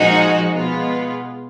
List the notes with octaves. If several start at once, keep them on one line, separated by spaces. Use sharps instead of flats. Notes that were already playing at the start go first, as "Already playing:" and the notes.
Already playing: A#2 F3 G#3 D#4 F#4
B2 G#3 B3 F4